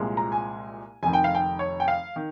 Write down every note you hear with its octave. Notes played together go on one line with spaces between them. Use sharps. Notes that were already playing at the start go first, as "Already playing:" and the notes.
Already playing: C2 A#2 F3 G#3
A#5
G#5
F1 F2 D#3 G#5
G5
F5
G5
C#5
G5
F5
D#3